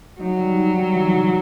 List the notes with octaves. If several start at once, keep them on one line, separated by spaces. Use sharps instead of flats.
F#3 D#4
G3
D#4
G3
E3
C3